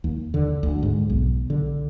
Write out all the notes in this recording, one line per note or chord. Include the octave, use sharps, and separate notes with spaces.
D#2
D3
D2
G#2
B1
D3